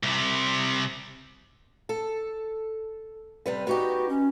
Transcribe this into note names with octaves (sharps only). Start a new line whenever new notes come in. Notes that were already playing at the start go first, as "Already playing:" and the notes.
C2 C3
A4
C3 G3 B4
B3 D#4 F#4 G4
C#4